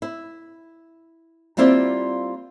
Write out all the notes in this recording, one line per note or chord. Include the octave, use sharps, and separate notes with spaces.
E4
G3 A#3 C4 E4 F4 D5